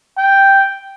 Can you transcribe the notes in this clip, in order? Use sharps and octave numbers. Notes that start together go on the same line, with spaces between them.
G5